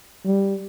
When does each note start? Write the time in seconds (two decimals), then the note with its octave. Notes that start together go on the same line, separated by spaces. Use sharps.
0.25 G3